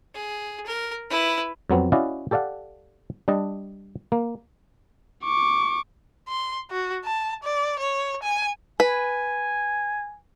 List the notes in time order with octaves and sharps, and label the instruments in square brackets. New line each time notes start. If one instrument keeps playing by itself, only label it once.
[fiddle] G#4
A#4
E4 B4
[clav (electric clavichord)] F2 F#3 B3 C4
C#4 E4 F#4 D5 D#5 F5
G4 A4 D5 F5 F#5
G3 D4 D#5 A5
A#3
[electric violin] C#6 D6
[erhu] C6
F#4
A5
D5
C#5
G#5
[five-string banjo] B4 [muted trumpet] G#5